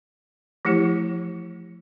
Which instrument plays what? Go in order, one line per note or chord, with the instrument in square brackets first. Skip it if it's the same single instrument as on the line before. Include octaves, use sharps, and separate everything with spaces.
[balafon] E3 F3 A3 E4 G4